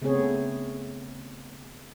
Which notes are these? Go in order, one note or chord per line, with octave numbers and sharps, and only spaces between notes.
C#3 A3 B3 C4 G#4 C#5